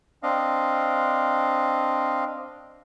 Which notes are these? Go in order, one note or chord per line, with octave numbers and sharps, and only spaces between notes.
C4 D4 D#5 F5